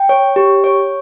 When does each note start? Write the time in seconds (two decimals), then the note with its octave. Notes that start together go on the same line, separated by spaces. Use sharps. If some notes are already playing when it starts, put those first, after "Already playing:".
Already playing: G5
0.09 C#5
0.36 G4
0.64 C#5